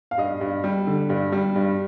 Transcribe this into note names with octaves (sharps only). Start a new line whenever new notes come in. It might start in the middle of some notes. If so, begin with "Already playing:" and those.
F5
G2 D#5
G2
G3
D3
G2
G3
G2